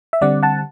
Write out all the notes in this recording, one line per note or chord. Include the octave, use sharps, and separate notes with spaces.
E5
D3 G3 C4 D5 F#5
F#5 A5